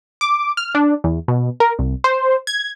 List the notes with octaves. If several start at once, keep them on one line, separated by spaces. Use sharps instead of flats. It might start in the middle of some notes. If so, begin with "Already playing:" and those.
D6
F6
D4
E2
B2
A#4
C2
C5
G#6